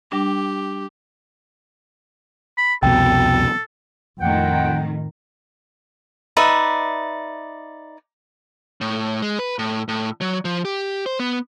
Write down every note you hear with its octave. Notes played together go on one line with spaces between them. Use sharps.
G3 D4 G4
B5
C2 F2 B2 A4 G5
F2 A2 D#3 C4 F#5 G5
D#4 B4 D5 E5
A2
G#3
B4
A2
A2
F#3
F3
G4
C5
B3